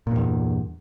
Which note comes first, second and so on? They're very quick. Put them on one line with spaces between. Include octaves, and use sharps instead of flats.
A#2 G2 E2